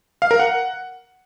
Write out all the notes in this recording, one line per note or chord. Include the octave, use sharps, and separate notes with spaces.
F5
A#4
F#5